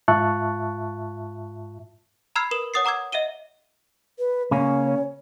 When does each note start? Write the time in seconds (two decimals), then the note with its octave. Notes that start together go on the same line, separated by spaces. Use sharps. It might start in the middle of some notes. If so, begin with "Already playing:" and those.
0.08 G#2 F4 E5 A5 C#6 F#6
2.36 A#5 B5 E6 F6 G#6 C7
2.51 A#4 B4 D#6 E7
2.74 C#5 F#5 D#6 A6 C7
2.85 F#5 A#5 D6 E6 G#6
3.12 D#5 E5 F#5 D#7 G7
4.19 B4
4.51 C#3 A#3 C#4 C#5